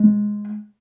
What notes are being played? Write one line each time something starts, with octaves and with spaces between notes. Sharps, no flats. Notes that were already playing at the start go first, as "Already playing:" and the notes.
Already playing: G#3